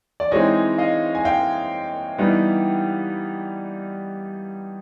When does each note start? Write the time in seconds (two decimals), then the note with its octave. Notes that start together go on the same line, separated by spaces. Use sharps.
0.20 D5
0.31 E3 G#3 C4 D#4 C#5 D#5
0.78 D#5 F5
1.15 G#5
1.25 F5 G5
2.18 E3 G3 B3 D#4